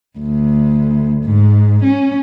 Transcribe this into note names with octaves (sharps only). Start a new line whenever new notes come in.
D2
G#2
C#4